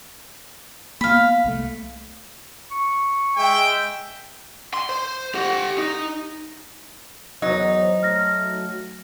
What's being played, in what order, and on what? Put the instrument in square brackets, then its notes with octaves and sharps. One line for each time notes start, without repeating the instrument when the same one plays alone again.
[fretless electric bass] A#3 B3 [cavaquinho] F5 B5
[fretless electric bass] C2 F3 A3
[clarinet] C#6
[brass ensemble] G#3 E5 G5
[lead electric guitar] C6
C5
G4 F#5
D#4
[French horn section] E2 A#4 C5 [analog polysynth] F#3 [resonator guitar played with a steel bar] D#4
[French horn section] A3 [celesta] F6 A#6